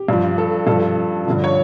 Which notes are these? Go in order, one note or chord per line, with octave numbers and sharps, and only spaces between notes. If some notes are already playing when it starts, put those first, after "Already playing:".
Already playing: G4
G2 F3
A4
G2 F3 A4
G2 D3 F3
C#5